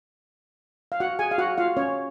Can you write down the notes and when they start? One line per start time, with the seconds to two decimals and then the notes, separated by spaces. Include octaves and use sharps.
0.92 F5
1.00 F#4 F#5
1.19 G#4 G#5
1.31 F5
1.38 F#4 F#5
1.58 F4 F5
1.77 C#4 C#5